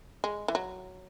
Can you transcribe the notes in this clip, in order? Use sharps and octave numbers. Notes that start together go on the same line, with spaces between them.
G#3
E3
F#3